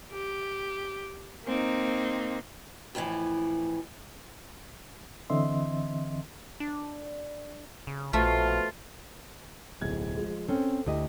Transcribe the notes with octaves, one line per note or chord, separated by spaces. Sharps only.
G4
A#3 C4 D#4
F2 A2 D#3 E3
D3 E3 C4 D#5 E5 C6
D4
C#3
A#1 B2 F3 A3 F4
D1 B1 G#6
F3 G#3
C4 C#4 A4 C5
D2 E4 G4 D#5